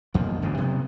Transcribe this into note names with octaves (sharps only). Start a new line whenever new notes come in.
B1 F2 F3 A#3
G1 D2 G#2 C#3
C3 F#3 G3 B3